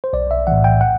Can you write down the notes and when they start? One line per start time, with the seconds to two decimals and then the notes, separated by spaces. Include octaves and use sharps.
0.04 C5
0.13 B1 D5
0.31 E5
0.47 A2 E3 F#5
0.64 G5
0.81 F#5